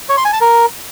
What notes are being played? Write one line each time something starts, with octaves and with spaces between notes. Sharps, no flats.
C#5
C6
G#5
A5
A#4